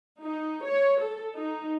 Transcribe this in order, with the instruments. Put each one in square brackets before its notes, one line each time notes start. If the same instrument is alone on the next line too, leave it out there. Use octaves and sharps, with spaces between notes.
[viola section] D#4
C#5
A4
D#4